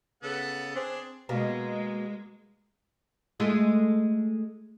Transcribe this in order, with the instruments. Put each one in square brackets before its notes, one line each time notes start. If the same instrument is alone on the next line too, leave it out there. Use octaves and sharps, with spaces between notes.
[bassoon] C#3 [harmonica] B3 A4 F#5
[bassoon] C4 [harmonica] D4 G#4
[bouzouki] B2 A#3 [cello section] G#3
[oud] G#3 A3 F4